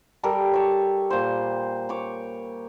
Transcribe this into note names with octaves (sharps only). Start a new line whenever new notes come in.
G3 A4 A#4 D6
C#5 A5
A#2 C5
C#5 D6